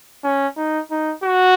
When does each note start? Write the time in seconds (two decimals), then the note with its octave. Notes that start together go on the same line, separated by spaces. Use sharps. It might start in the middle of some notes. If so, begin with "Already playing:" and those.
0.24 C#4
0.57 D#4
0.91 D#4
1.24 F#4